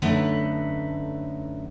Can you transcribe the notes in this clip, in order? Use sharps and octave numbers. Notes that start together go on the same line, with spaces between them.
F#2 D3 A3 D#4 B4 F#5